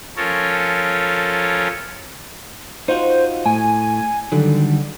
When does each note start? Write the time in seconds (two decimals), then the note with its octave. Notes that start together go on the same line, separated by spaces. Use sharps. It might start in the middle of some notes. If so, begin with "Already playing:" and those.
0.17 F3 C#4 A4 A#4 C#5
2.88 D#4 F4 F#4 C5
3.45 A2 G#5
4.32 D3 D#3 F#3 G3